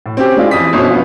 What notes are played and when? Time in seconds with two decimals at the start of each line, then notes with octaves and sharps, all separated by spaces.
0.06 A2
0.17 C4 C#4 G4
0.37 G#3 D4 E4 F4
0.51 F2 E3 D#6 B6
0.73 G1 B2 F3 C#4
0.91 B3 F4